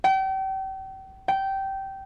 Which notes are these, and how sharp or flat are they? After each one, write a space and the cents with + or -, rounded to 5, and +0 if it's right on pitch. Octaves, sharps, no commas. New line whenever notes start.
G5 -35
G5 -15